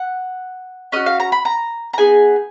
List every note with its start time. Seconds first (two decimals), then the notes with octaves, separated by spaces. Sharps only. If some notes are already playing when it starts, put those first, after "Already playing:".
Already playing: F#5
0.92 C#4 F#4 D#5
1.06 F5
1.20 A#5
1.32 B5
1.45 A#5
1.93 A#5
1.98 B3 D#4 G#4 G#5